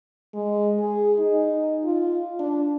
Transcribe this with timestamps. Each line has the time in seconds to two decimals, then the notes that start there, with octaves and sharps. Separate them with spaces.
0.34 G#3
0.79 G#4
1.19 D#4
1.85 F4
2.39 D4